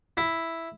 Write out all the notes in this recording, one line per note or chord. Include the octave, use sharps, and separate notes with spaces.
E4